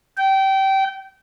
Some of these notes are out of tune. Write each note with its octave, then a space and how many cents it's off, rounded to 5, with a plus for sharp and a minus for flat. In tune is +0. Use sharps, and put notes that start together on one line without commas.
G5 -25